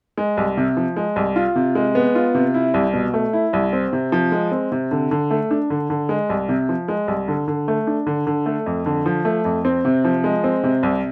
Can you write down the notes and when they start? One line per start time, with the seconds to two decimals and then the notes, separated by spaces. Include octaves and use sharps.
0.17 G#3
0.37 C2
0.57 C3
0.77 F3
0.96 G#3
1.16 C2
1.36 F4
1.56 C3
1.75 G#3
1.95 B3
2.15 F4
2.35 C3
2.54 E4
2.74 C2
2.94 B2
3.14 A3
3.33 E4
3.53 C2
3.73 C4
3.93 C3
4.12 F3
4.32 G#3
4.51 C4
4.72 C3
4.91 D3
5.11 D3
5.31 A3
5.51 D4
5.70 D3
5.90 D3
6.09 G#3
6.30 C2
6.49 C3
6.69 F3
6.88 G#3
7.08 C2
7.28 D3
7.48 D3
7.68 A3
7.87 D4
8.07 D3
8.27 D3
8.46 A3
8.66 F2
8.86 D3
9.06 F3
9.25 A3
9.45 F2
9.65 C4
9.85 C3
10.05 F3
10.24 G#3
10.44 C4
10.63 C3
10.83 C2